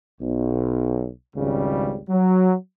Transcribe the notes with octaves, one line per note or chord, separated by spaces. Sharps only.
B1
G#1 C#2 C#3 G3
F#3